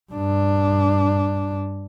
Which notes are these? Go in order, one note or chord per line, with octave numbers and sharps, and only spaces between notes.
G2 D4